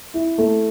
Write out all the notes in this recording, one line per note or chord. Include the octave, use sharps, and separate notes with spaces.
E4
A3